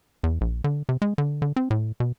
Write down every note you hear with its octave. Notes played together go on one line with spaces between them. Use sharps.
E2
A#1
D3
C3
G#3
D3
D3
C4
A2
B2